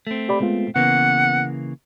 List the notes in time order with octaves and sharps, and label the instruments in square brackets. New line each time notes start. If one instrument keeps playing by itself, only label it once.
[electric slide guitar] A3 C4
[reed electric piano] G4 D5 B5
G#3 B3 F4
[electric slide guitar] C#3 E3 A#3 [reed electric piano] B3 [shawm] F#5